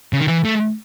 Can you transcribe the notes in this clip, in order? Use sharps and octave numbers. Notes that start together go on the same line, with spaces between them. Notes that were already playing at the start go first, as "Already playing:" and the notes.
C#3
D#3
E3
A3